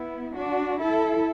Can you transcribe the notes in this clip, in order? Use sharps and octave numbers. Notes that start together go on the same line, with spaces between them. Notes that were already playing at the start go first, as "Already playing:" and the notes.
Already playing: B3 E4
D4 F#4
E4 A4